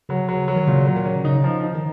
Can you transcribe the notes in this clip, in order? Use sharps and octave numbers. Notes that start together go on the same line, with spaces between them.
C#3 F#3
F#3
F#3
D#3
A#2 C#3
F#3
D#3
C#4
C#3 D#4
F3
D#4
D#3